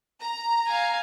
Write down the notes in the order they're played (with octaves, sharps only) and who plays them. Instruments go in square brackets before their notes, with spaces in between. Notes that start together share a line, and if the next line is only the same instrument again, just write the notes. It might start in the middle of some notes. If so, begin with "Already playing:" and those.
[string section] A#5
[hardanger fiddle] F5 G#5